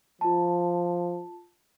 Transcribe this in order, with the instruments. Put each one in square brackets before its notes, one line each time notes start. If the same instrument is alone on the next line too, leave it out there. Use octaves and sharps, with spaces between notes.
[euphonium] F3 [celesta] F4 A5